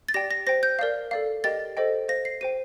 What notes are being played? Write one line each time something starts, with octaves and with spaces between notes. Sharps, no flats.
A6
G4 D5 G5 A#6
A#6
C5 G5 A#6
G6
A#4 D5 F5
A4 D5 F5
G4 A#4 D#5 G5 A6
A4 C5 D#5 G5
C5 F5 A#6
C7
G4 C5 G5 D#7